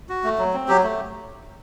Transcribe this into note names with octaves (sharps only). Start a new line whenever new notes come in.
F#4
A3
F#3
C4
F#3 G4
A3